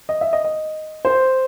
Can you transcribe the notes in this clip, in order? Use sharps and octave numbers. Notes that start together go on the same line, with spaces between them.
D#5
E5
D#5
D#5
C5